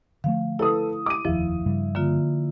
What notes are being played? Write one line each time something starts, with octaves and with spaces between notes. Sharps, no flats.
D3 F3 A3 F5
E4 A4 B4 D#6
D6 D#7
F1 D#2 F3 E4
G2 C#3 G3
D3 A#3 F4